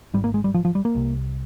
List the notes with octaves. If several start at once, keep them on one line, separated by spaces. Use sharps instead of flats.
G#1 G#2 G3
A#3
G#3
G3
F3
F3
G3
A#3
C2 C3